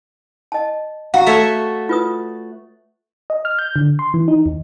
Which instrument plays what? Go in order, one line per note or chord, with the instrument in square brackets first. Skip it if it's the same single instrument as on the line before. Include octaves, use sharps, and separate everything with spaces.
[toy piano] D#5 A5
[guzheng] F#4 [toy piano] F5 F#5 A#5
[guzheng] A3 C#5 E5
[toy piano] F4 B4 D#6
[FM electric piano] D#5
F6
G6
D3
C6
E3
D#4
D#2